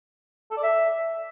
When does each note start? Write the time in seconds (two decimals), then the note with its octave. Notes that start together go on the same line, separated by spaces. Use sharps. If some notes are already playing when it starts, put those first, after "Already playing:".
0.51 A4
0.57 D5
0.63 E5